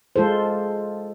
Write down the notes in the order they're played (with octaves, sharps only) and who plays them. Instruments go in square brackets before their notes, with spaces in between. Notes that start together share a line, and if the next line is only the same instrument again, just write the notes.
[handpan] G#3 F4 A4 C5